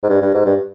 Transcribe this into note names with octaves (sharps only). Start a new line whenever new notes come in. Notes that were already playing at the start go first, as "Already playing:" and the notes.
G#2
G2
G2
G#2
G2